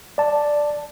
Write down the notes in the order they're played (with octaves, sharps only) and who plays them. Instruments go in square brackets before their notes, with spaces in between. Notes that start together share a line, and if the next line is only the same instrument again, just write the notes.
[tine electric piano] D5 A5